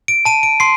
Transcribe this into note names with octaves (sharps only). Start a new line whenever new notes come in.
D7
A5 D#7
D7
C6 C7